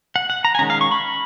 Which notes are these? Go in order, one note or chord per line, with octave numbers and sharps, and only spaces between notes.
F#5
F#5
A#5
G#5
D#3 G#3 C#4 A#5
F5
C#6
B5